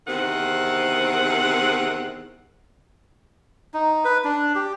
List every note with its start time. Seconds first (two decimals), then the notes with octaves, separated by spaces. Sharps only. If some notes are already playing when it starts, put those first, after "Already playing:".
0.07 E2 C3 D#3 C4 F#5
3.74 D#4
4.05 B4
4.24 D4
4.55 G4